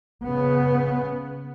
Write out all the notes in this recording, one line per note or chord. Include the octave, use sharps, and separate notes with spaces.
C#3 B3